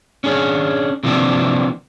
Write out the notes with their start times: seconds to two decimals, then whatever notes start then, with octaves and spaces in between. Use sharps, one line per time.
0.24 C#4 D4 G#4
1.04 C3 E3 F3 A#3 C4 D4